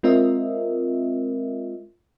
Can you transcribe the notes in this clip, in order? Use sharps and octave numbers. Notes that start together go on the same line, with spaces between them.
G#3 C4 F4 A#4 D#5 E5